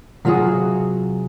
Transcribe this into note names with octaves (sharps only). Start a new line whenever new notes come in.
C3 F#3 F4 F#4 G#4